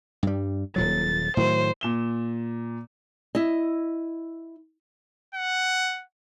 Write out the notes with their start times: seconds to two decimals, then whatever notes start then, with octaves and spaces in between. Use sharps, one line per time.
0.23 G2 G3
0.76 D#1 A#2 F#3 A6
1.37 A2 D#3 F#3 C5
1.81 A#2 E7 G7
3.35 E4 D#5
5.35 F#5